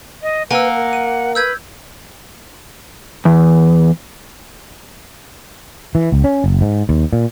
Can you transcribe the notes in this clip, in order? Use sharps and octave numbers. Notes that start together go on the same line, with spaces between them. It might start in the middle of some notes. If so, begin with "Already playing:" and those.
D#5
A#3 B4 F#5 G#5 E6
A#4
D#7
B4 E6 G6 G#6
E2
E3
C#2
C#4
F#1
G#2
D#2
A#2